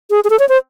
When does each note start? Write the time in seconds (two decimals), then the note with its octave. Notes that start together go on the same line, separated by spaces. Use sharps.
0.10 G#4
0.24 G#4
0.30 A4
0.39 C#5
0.49 C5